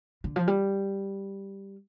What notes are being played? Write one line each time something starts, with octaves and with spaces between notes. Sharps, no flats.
D3
F3
G3